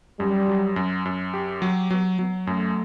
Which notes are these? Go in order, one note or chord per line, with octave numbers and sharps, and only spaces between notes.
F#2 G3
F#3
F#2
F#2
G4
F#3
F#3 B3
F#3 B3
F#2 A3